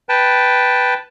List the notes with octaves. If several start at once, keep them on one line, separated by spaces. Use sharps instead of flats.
B4 G5 A5